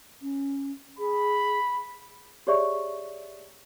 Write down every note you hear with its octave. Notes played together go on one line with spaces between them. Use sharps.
C#4
G#4 B5
G4 G#4 C#5 D5 E5 C#6